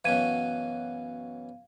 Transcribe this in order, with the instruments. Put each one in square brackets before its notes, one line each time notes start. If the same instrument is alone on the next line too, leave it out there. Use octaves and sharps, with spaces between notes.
[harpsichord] F#2 B2 E3 [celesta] F5 G#6 D#7